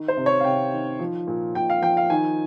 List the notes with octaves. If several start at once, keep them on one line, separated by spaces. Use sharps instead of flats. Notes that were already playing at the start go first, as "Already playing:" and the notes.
Already playing: D#3
C5
C3
C#5
F5
C3 G5
D#3
F3
A#2
A#2 G5
F5
F3 G5
F5
D#3 G#5